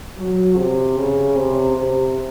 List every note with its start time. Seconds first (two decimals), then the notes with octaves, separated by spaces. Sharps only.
0.18 F#3
0.57 C3
0.97 C#3
1.37 C3
1.77 C3